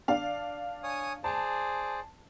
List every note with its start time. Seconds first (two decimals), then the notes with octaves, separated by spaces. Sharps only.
0.08 D4 D5 F5
0.83 C#5 G#5 D#6
1.24 G#4 C5 D5 A5